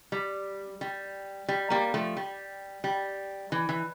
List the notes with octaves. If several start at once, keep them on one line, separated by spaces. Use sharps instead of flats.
G3
G3
G3
G3 A#3
F3 A3
G3
G3
E3
E3